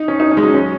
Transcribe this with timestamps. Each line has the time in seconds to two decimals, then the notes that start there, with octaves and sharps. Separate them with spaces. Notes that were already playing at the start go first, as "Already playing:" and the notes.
Already playing: D#4
0.08 C#4
0.20 D#4
0.31 C#4
0.37 G#3
0.43 F#3
0.54 C#4